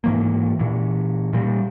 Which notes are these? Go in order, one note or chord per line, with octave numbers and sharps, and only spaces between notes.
G#2 E3 A#3
A#2 E3
A#2 G3